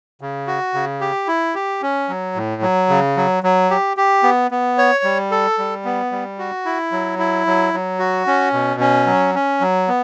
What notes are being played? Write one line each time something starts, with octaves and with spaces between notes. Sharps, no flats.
C#3
F#4
C#3
G4
E4
G4
C#4
F#3
A2
F#3
C#3
F#3
F#3
G4
G4
B3
B3
C#5
G3
A4
G3
B3
G3
F#4
E4
F#3
E4
F#3
F#3
F#4
C#4
B2
C#4
F#3
C#4
F#3
B3